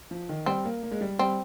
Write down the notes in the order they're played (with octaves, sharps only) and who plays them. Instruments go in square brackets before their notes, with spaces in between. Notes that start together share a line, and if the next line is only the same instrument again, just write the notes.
[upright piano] F3
D#3
[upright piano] G3 [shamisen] C4
[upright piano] A#3
A#3
G#3
G3
[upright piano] G3 [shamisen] C4